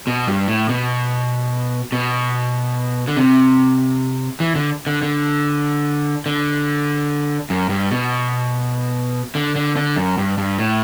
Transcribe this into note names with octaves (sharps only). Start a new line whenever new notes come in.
B2
G2
A2
B2
B2
D3
C3
E3
D3
D3
D3
D3
F#2
G2
B2
D3
D3
D3
F#2
G2
G2
A2